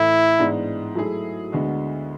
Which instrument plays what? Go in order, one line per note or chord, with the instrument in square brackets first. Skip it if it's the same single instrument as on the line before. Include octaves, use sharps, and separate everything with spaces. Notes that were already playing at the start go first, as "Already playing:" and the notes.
Already playing: [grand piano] A2 E3 A3 [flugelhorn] E4
[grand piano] G#2 E3 G#3 B3 D4
F#3 A3 E4 G#4
D2 D3 G#3 B3 F#4